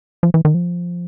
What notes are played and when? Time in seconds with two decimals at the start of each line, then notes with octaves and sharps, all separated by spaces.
0.23 F3
0.34 E3
0.45 D#3
0.54 F3